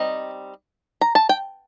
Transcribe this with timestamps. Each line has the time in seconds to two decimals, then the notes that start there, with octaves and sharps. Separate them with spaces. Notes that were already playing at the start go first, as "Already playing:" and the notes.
Already playing: G3 C4 D#4 D#5
1.01 A#5
1.15 A5
1.29 G5